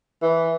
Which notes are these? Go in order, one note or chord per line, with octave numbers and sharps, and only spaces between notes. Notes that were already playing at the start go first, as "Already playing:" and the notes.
E3